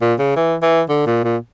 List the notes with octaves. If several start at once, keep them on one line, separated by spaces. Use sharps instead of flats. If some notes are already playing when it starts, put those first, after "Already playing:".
A#2
C#3
E3
E3
D3
A#2
A#2